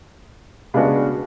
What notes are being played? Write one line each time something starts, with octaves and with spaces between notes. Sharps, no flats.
C#3 G#3 B3 D4 F#4